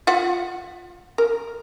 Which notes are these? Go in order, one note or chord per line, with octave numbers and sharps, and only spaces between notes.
F4 E5 F#5
A#4